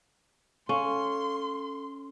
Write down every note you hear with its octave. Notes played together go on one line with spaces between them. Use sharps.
C#4 A4 F5 C6